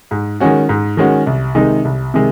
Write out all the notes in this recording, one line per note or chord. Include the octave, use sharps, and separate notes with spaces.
G#2
D#3 G#3 C#4 F#4
G#2
D#3 G#3 C#4 F#4
C2
C3 D#3 G#3 D#4
C2
C3 D#3 G#3